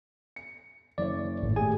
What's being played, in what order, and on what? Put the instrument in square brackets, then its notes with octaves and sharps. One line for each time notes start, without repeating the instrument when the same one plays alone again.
[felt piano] C#7
[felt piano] F#1 C#5 [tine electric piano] D5
[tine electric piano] G#1 A2
[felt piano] A3 G4 G#4 [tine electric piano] G#5